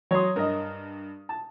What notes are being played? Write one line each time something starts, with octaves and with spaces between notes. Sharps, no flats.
F#3 C#5 C6 D#6
G2 A#4 D#5
A5